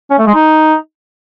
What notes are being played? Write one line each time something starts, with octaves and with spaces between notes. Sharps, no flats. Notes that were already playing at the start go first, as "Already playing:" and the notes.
C#4
A3
G#3
D#4